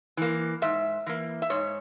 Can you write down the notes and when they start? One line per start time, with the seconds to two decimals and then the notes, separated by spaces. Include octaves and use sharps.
0.17 E3 A#3
0.62 G#2 E5
1.06 E3 A#3
1.42 E5
1.50 G#2 C#5